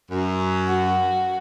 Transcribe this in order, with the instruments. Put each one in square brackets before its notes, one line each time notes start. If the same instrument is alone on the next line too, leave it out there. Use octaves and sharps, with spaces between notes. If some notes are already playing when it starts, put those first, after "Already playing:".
[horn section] F#2
[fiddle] F#4